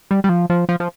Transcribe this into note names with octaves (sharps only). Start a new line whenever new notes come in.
G3
G3
F3
F3
F3
F3